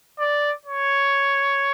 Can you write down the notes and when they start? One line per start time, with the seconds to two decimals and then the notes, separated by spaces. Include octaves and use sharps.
0.19 D5
0.65 C#5